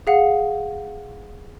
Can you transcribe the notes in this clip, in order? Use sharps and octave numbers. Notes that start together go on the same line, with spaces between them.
G#4 F5 F#5